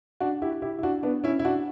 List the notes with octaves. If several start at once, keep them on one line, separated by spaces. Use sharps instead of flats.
D4 F#4
E4 G4
E4 G4
E4
D4 F#4
B3 D4
C#4 E4
E4
D4 F#4